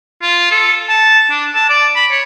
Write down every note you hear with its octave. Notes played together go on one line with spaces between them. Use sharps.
F4
A4
A5
D4
A5
D5
B5
C#5